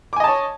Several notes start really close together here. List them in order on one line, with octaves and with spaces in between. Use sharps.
D6 G#5 D#5 A5 C#5